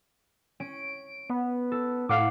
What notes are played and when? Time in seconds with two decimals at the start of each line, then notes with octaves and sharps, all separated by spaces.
0.60 C#4 D7
1.30 B3
1.72 A4
2.09 A2 F5 F#5 D6